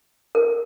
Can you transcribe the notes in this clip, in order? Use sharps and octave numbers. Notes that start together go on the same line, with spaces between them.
A#4